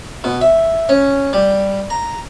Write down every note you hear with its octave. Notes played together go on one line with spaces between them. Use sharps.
B2
E5
C#4
G3
A#5